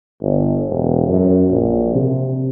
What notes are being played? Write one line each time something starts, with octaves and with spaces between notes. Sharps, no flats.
G1
E1
F#2
A#1
C3